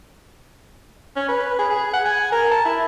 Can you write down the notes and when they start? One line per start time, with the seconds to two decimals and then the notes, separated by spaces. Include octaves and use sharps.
1.16 C#4
1.29 B4
1.59 G#4
1.70 G#4
1.94 F#5
2.05 G#5
2.32 A#4
2.51 A5
2.65 E4